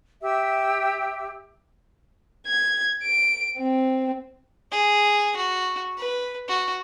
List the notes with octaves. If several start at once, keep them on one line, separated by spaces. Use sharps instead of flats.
G4 E5 E6
G#6
D7
C4
G#4
F#4
B4
F#4